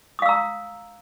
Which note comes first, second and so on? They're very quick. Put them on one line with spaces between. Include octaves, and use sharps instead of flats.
D#6 F5 E6 A#5